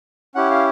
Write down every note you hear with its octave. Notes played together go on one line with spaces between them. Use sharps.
C#4 E4 G4 F#5
F5